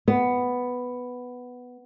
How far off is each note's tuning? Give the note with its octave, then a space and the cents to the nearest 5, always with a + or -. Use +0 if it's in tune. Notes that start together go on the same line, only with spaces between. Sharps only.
B3 +5